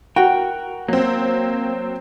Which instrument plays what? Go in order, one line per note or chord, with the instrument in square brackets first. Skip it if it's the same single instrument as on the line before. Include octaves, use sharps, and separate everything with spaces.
[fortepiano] F#4 [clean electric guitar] A#4 [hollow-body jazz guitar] G5
[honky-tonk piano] F#3 C4 [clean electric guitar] A#3